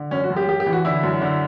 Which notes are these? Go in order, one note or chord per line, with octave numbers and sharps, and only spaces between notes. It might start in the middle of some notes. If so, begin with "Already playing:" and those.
Already playing: D3
F#2 C#4
F#4
F#2
G4
F#2 G4
G4
E3
F#4
D3 E4
F#2
D3